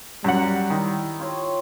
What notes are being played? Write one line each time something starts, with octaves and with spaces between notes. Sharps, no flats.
F#2 F#3 G3 F#5
D#3 D#4 E4
C4 F4 C#5